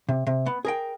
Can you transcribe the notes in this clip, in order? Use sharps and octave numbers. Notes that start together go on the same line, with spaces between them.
C3
C3
B3
G#4 A#4 G5